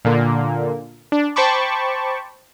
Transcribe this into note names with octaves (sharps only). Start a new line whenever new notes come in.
A#2 D3 A#3
D4
C5 G5 A5 B5 C#6 D6